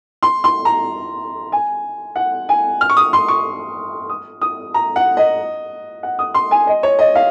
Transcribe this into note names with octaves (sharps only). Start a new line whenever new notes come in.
C6
C6
A#5
G#5
F#5
G#5
F6
C#6
D#6
C6
C#6
D#6
D#6
A#5
F#5
D#5
F#5
D#6
C6
G#5
D#5
C#5
D#5
F5